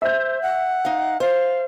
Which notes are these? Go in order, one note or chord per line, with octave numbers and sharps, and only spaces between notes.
C5 E5 G6
F#5
D#4 F5
C5 F5